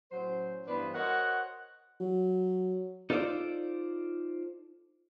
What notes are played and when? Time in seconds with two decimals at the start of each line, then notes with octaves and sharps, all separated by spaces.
0.12 A2 F#3 C#4 C5
0.67 G2 E3 B3 D4 B4 C5
0.94 F#4 A#4 C5 C#5 D#5 F#5
2.00 F#3
3.10 D#4 F4 A4 C5 D5